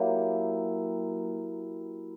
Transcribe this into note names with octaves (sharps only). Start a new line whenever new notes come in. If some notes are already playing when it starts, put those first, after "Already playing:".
Already playing: F#3 A#3 E4 G4